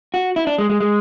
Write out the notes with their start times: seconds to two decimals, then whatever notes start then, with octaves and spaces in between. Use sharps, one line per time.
0.14 F#4
0.36 E4
0.47 D4
0.58 G#3
0.70 G#3
0.80 G#3